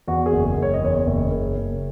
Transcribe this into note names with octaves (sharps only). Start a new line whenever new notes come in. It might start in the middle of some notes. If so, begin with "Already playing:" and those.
E2 F#4
G#4
F#1
G#4
F#1
C#5
D#5
E2 C#5
F#1
F#1
F#1